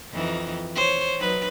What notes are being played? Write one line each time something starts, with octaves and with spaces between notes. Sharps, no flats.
F2 E3 D#4
C5 C#5
F#3 D#4 B4